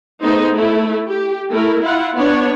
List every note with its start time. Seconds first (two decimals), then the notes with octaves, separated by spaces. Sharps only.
0.21 A3 B3 D#4 G#4 C5
0.53 A3 E4
1.08 G4
1.50 A3 E4 A#4
1.83 E4 F4 F#5
2.15 B3 D4 C#5